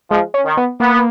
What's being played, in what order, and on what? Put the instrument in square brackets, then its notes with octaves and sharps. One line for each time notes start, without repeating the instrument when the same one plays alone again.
[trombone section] F3 [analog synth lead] G#3
[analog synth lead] C#4
[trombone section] D#3
[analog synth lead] B3
[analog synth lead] A#3 [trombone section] B3